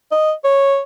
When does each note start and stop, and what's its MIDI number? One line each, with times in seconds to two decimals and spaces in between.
0.12 0.33 75
0.44 0.81 73